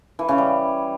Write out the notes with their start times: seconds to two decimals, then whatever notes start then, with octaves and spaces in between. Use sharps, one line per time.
0.19 E3
0.28 C#3
0.38 G3